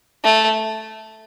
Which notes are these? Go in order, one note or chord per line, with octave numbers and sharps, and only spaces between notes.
A3